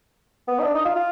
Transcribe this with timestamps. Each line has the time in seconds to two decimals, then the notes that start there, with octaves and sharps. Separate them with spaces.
0.48 B3
0.59 D#4
0.63 D4
0.74 D#4
0.85 F4
0.95 F4